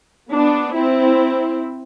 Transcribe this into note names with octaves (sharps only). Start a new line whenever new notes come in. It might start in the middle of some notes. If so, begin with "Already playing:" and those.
B3 D4
C4 E4